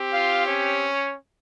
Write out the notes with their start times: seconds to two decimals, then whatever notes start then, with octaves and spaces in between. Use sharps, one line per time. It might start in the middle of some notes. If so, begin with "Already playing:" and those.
Already playing: C4 G4
0.11 F4 F5
0.47 C#4 C#5